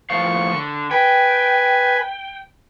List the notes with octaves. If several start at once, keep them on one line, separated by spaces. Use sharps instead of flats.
A2 F3 F5 C#6
D3
B4 G5 G#5